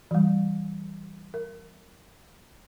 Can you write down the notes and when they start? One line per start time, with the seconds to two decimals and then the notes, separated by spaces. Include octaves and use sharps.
0.11 E3 G3
1.34 A#4